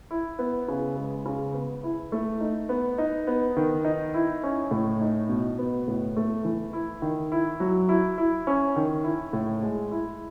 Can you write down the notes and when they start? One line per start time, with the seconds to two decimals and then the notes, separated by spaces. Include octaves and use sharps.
0.11 E4
0.39 B3
0.68 C#3
0.97 G#3
1.25 C#3
1.54 B3
1.83 E4
2.12 A3
2.41 D#4
2.69 B3
2.98 D#4
3.27 B3
3.57 D#3
3.85 D#4
4.14 E4
4.43 C#4
4.71 A2
5.01 D#4
5.29 B2
5.59 B3
5.88 A2
6.17 A3
6.45 E3
6.73 E4
7.02 D#3
7.32 E4
7.60 F#3
7.89 E4
8.18 E4
8.47 C#4
8.76 D#3
9.04 E4
9.33 A2
9.63 G#3
9.91 E4